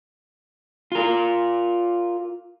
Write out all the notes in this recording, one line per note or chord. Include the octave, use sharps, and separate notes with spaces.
F4 A#4